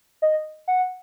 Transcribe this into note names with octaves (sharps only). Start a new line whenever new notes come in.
D#5
F#5